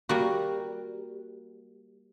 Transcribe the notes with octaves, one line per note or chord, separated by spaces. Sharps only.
G3 A#3 F#4